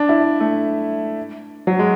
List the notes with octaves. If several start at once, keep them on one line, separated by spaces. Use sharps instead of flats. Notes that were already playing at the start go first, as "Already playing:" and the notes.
Already playing: D4
E4
A3
F#3
G#3